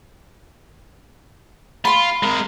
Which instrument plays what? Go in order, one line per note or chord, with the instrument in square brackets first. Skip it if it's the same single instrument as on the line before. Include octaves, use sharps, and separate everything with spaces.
[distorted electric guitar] F4 [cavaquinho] B5 C6
[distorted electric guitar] G#3 A#4